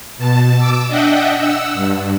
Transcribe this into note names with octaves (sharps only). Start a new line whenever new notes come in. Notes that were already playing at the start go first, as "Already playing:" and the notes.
B2 A5
D6 E6
D4 D#5 E5 F#5 G5
F#5 E6
G2